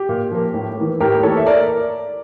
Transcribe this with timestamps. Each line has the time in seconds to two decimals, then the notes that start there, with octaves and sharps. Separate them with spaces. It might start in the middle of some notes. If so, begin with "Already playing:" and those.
Already playing: G4
0.09 A#2
0.32 F3 A#3
0.54 A2
0.77 E3 A#3
1.00 A2 G4 A#4
1.23 E3 A#3 A4 C#5
1.37 E5
1.46 A#4 D5